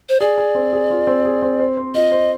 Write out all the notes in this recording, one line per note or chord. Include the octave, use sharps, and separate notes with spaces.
C5
G#4 D5
G#4
C4
G#4
F4
C4
G#4
C4
C5
C5
F4 D#5
C5